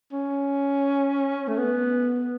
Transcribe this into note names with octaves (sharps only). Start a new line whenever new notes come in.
C#4
A3
B3